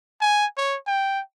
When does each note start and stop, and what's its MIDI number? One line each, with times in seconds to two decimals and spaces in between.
0.21 0.46 80
0.57 0.76 73
0.87 1.20 79